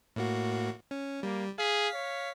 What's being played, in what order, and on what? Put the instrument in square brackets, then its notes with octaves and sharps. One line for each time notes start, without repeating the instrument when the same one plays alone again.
[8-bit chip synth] A2 A#3 F#4
C#4
[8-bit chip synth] G3 [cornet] A#3
[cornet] G#4 [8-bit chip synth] F5 B6
[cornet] C#5